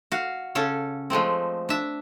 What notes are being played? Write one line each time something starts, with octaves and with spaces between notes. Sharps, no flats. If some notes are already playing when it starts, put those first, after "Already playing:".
F#4 F5
C#3 C#4 A4
F3 G#3 A3 C4
D4 E5